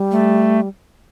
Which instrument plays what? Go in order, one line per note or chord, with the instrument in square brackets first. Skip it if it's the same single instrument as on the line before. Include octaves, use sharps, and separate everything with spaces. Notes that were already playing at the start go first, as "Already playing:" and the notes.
Already playing: [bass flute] G3
[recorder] A3